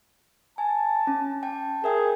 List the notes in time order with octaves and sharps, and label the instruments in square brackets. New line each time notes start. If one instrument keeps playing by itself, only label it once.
[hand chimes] G#5 [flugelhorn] A5
[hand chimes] C#4
G5 A5
[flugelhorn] G#4 [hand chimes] A#4 E5 G5